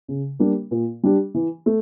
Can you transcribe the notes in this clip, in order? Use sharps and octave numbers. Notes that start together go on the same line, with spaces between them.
C#3
G3 A#3 D4
A#2
G3 D4 G4
E3
A3